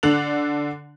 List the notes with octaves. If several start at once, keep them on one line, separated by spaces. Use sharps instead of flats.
D3 D4 A4 F#6 F7 F#7